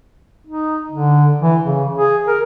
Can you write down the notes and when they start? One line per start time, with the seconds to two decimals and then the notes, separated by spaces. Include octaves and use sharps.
0.47 D#4
0.91 D3
1.42 E3
1.63 C#3
1.98 G#4
2.27 A#4